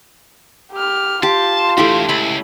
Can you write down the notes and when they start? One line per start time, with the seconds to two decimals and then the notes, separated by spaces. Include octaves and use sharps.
0.72 G4 F6
1.23 F4 G4 A5 C6
1.77 E3 A3 D4 E4 G4
2.09 C#2 E4 B5